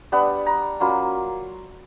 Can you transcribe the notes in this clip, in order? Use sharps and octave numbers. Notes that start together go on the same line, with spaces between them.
G3 B3 D4 F#5
A#5
F#3 A#3 C#4 F4 B5